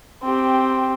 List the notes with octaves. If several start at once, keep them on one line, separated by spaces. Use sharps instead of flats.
C4 G4